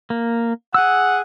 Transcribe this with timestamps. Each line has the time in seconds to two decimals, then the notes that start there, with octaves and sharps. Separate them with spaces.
0.10 A#3
0.74 G#4 F#5 E6